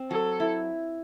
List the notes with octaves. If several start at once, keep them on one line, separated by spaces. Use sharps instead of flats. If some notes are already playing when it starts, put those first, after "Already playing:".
Already playing: C4
F#3 A4
E4